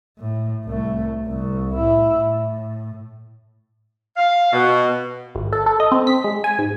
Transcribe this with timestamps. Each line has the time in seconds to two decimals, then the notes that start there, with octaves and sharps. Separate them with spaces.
0.18 A2
0.65 C2 A3
1.26 C2
1.74 A2 E4
2.16 A2
4.17 F5
4.53 B2
5.35 G#1
5.53 A4
5.66 A4
5.80 D#5
5.92 C4
6.07 B6
6.24 G#3
6.44 G#5
6.59 G#2